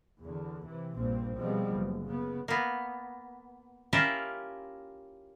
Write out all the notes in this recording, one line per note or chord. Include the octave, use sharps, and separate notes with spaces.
E2 D3
C3 E3
A#1 G2 A#2 C4
B2 F3 G3 G#3 B3 C4
F#1
C#3 B3
A#3 B3
C#4 E4 F4 G4 A#4 E5